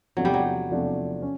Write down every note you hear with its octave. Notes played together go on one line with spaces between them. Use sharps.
E2 C3 F3 F#3 A3 D4
G3
F#3
E2 C3 F3 A3 D4
C#4